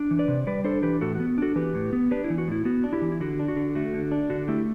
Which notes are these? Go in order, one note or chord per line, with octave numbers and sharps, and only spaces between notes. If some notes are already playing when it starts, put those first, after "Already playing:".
Already playing: D4
E3
B4 D5
C3
G3 B4 D5
D4 A4 C5
E3 G4 B4
A2 F#4 A4
F#4
B3
D4 F#4 A4
E3 G4 B4
A2
B3
D4 G4 B4
E4
E3
F#4
A2 E4
B3 F#4
D4
E4 G4
E3
E4
D3 F#4
D4
F#4
D3
A3 F#4
D3
D4
D3 F#4
A3 E4 G4